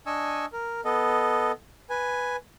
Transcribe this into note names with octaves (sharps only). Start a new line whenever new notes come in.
D4 D#5 G#5 C#6 E6
A#4
B3 A4 D#5
B4 G#5